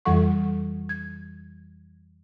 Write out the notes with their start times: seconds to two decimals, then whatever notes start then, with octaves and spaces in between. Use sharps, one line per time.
0.05 F2 E3 G3 A4 F#5 C#6
0.89 G#6